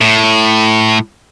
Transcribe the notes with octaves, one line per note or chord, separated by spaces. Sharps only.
A2